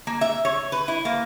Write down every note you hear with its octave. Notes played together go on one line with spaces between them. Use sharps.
A#3
E5
C#5
B4
E4
A#3